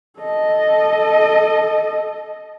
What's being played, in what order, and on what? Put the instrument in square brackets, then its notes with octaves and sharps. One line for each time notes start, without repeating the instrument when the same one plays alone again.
[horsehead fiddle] A4 D#5